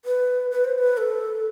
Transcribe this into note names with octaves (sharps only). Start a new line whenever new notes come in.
B4
B4
C5
B4
A4